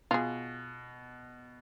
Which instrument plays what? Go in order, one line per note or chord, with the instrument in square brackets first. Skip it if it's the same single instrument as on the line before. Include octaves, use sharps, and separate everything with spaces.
[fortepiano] B2 [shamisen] F4 G#4